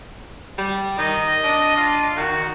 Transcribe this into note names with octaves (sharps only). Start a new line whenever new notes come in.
G3
D#3 D#5
D4
F4
D#3 F#4